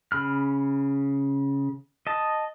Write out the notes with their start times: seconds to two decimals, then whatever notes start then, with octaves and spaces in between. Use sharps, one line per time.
0.12 C#3 B5 F6
2.07 D#5 A5